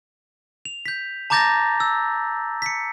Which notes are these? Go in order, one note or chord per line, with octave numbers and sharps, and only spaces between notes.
F7
G6 B6
A5 A#5 D6 G6 A6 A#6
E6
B6 C#7